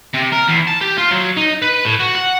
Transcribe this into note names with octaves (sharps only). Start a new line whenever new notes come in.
C3
A#4
E2
A5
G4
F4
F#3
D#4
B4
A2
F#4
F#5